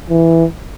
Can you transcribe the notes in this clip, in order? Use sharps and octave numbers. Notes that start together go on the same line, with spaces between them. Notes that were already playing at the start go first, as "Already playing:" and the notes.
E3